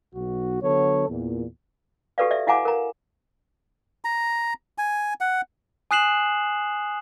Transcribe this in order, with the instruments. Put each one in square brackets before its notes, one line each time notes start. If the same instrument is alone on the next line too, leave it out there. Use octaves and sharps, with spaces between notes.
[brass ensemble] B1 F#4
D3 F#3 B3 A4 C#5
E2 A#2
[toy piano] F#4 G4 A4 B4 D5 F5
D5 E5
E4 F5 F#5 G#5 A#5 D6
A#4 A#5
[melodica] A#5
G#5
F#5
[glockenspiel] G#5 D#6 F#6 C7 E7 F#7